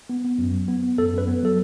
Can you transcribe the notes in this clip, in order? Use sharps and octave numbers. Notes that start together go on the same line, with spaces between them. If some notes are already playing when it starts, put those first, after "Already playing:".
B3
B3
F#2
F#3
B3
B3
F#2 A4
F#2 B4
B3
F#3 A4